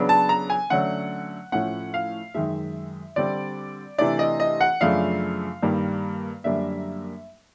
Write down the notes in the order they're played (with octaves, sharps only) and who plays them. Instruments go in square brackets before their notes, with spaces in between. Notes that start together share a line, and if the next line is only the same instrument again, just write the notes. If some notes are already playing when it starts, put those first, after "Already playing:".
Already playing: [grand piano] C#3 F#3 B3 D4
A5
A#5
G#5
D3 F#3 A3 C#4 F#5
A2 F3 A3 C#4 F#5
F5
F#2 D#3 G#3 E5
D3 G3 C4 D5
C3 E3 A3 D4 D5
D#5
D#5
F#5
F#2 C#3 F3 A3 D4 F5
G2 D#3 G3 A#3
F#2 D3 G3 A#3 D4 E5